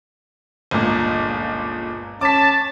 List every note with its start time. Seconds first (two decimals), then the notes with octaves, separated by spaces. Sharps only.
0.71 G1 C#2 A#2
2.21 C#4 A5 D6 B6